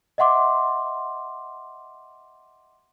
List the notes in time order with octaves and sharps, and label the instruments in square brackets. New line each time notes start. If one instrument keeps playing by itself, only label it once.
[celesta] D#5 E5 F#5 C6 D6